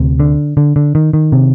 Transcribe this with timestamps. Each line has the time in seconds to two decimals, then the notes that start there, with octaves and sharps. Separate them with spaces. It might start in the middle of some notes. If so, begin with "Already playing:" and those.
Already playing: D2 C3
0.20 D3
0.57 D3
0.76 D3
0.95 D#3
1.13 D#3
1.32 C3